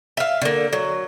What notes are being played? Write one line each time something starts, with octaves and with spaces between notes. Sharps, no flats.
E5 F5
D3 A#3
F#3